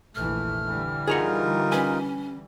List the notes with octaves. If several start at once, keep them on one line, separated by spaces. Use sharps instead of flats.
F1 A#1 E3 A3 F6
D3 E3 G3
D#4 F4 G#4 A#4 F5 F#5
C#4 B4 G#5